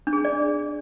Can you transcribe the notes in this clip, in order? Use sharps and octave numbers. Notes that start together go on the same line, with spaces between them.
D4
G#4
D4
D5